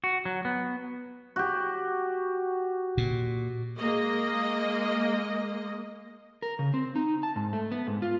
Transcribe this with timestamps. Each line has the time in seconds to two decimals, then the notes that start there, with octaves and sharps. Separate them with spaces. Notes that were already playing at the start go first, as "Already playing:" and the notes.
0.04 F#4
0.25 F#3
0.45 B3
1.36 F#4 G4
2.98 A#2
3.78 G#3 A#3 D#5
6.42 A#4
6.59 C#3
6.74 C4
6.96 D#4
7.23 A5
7.36 G#2
7.53 A3
7.72 B3
7.87 G#2
8.02 F4